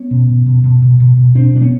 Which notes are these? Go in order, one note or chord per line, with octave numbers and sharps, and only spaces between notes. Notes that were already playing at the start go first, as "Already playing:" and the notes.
Already playing: B3 C#4
B2
B2
B2
B2
B2
B2
B2
B2 C4 D4
B2 D4
B3 C#4